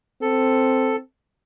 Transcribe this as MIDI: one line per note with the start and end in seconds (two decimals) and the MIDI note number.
0.22 1.00 60
0.22 0.96 69